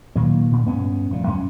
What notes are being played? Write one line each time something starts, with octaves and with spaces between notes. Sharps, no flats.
A#2 D#3 F#3 A#3
A#2
G2 B3 C#4
F1 A#2
F#2 C#4